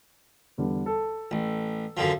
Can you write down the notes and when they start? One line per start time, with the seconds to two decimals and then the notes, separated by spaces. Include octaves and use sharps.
0.58 E2 D3 G3
0.86 A4
1.31 A1
1.97 F#2 D3 F3